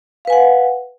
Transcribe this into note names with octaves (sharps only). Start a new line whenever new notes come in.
B4 F5 F#5 G#5